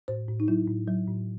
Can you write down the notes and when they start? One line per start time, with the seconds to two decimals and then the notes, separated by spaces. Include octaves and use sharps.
0.08 A2 C5
0.28 A2
0.40 D#4
0.48 F#3 E4
0.67 A2
0.88 F#3
1.07 A2